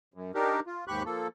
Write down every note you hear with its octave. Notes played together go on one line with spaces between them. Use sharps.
F#2
D4 D#4 G4 A#4
F4
D#2 G#2 G4 B5 C#6 F#6
F3 A#3 A4